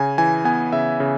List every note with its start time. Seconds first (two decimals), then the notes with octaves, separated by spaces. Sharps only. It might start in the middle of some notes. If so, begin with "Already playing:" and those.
Already playing: C#3 G#5
0.18 E3 G#5
0.45 B3 G#5
0.72 C#3 E5
1.00 C#3